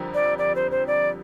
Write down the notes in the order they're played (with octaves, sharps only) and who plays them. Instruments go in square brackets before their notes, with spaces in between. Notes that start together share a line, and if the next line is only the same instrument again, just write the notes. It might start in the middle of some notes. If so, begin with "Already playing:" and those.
Already playing: [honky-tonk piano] F2 D3 G3 C4 A#4
[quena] D5
D5
C5
C5
D5